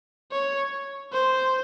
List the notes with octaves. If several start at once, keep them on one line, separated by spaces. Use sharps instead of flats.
C#5
C5